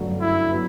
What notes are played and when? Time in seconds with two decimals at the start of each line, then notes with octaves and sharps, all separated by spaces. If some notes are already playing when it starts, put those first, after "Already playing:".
Already playing: G1 F#2 F#3 A3 D4
0.20 E4
0.51 F#3 B3